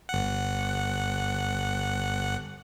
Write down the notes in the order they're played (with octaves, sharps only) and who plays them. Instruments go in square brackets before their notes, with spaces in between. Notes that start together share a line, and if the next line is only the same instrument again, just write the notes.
[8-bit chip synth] G1 F#5